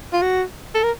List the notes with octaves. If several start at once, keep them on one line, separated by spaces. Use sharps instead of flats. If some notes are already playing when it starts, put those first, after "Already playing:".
F4
F#4
A4
A#4